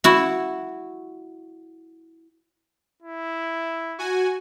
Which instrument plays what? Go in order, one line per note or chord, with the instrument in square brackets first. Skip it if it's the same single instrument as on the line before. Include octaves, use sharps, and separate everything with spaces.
[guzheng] E4 F#4
[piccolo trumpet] E4
[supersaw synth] F#4 G#5